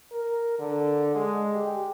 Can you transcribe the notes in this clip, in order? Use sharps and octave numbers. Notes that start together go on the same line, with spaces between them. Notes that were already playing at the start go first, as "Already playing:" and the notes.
A#4
D3
G#3
G4